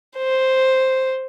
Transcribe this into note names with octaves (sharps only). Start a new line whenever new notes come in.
C5